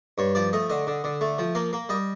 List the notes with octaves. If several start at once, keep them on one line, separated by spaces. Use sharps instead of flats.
G2 C#5
F3 D5
A3 D#5
D3 D#5
D3
D3
A3
F3
A#3 F5
A#3
G3 D#5